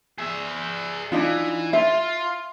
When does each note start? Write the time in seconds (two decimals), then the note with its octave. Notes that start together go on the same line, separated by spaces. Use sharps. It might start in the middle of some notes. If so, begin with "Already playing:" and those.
0.18 G#4 E5
1.12 E3 D4 D#4 F4
1.73 F4 E5